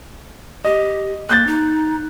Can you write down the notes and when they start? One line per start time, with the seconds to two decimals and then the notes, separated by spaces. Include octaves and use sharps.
0.65 G4 D#5
1.29 A#3 F#6 G6 A6
1.47 D#4